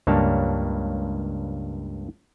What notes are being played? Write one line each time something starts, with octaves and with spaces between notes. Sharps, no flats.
C#2 G2 A#3 D4 C#5 A5